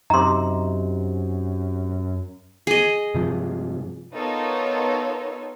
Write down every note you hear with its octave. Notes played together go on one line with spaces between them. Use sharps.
F#2 C3 D#4 A#5 C6
G#4 D#5
G2 C3 F3
B3 D#4 F4 A4 A#4 C#5